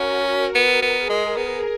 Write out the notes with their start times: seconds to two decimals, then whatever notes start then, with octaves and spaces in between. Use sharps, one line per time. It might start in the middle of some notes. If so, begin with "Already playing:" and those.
Already playing: C#4 F#4 A#4
0.55 B3 A#4
0.82 B3
0.96 G#4
1.09 G#3
1.37 B3